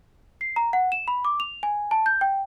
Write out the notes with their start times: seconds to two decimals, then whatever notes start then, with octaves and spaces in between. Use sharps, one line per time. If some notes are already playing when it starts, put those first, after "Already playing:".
0.41 C7
0.56 A#5
0.73 F#5
0.92 E7
1.08 B5
1.25 D6
1.40 F7
1.63 G#5
1.91 A5
2.06 G6
2.21 G5